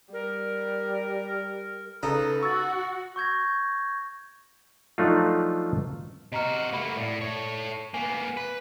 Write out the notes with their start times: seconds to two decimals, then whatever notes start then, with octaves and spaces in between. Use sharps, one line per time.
0.13 G3 A#4
2.03 C#3 D#4 A4 B4
2.43 F#4 C#6 E6 A6
3.16 C#6 G6 G#6 A#6
4.98 F3 F#3 A3 D4 D#4 F4
6.32 C3 F#4 D#5 A#5 F6
6.73 A3 A#3 F#5 B5
6.97 A2 D5
7.21 A4 C#5
7.94 A#3 B3 G#5
8.37 B4